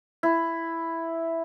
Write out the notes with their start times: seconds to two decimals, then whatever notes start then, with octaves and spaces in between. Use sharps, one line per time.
0.23 E4